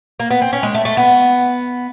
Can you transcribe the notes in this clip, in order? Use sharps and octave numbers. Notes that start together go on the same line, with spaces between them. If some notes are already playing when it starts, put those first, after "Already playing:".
A#3
B3
C4
C#4
G#3
A3
A3
B3